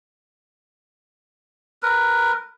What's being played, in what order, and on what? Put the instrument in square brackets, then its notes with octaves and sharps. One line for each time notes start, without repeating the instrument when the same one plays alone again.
[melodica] A#4 B4